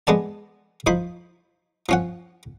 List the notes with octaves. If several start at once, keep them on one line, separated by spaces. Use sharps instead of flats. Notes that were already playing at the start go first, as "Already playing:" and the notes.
G#3 B3 D5 A5
F3 D#4 C5 B5
F3 C#4 F#5